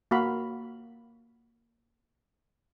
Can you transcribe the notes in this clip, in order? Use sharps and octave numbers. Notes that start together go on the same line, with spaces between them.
A#3 F#4 F5 B5